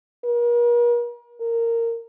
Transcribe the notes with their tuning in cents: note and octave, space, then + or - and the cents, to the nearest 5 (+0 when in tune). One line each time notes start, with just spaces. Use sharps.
A#4 +40
A#4 -15